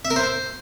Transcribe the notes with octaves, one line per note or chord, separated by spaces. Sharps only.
E5
A#4
C5